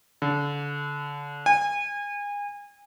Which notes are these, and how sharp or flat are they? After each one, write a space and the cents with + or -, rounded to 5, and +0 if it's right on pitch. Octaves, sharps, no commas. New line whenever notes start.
D3 -30
G#5 -30